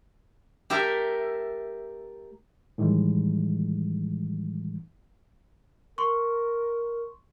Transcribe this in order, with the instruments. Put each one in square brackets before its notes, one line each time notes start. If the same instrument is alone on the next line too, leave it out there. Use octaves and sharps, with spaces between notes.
[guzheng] A3 G4 A#4 E5
[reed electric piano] A2 D#3 E3 G3 G#3
[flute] A#4 [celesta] C6 C#6